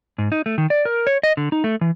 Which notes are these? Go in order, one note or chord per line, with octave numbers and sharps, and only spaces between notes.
G#2
D#4
A3
D#3
D5
A#4
C#5
D#5
D3
D#4
A3
E3